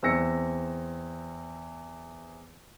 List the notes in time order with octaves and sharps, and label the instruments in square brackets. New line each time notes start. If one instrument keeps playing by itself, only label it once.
[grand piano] E2 C4 E6 A#6 C#7